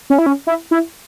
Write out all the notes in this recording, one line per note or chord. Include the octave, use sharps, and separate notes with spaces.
C#4
E4
C#4
E4
E4